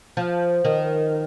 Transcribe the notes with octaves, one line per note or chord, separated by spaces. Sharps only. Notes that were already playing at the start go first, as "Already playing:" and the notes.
F3
D#3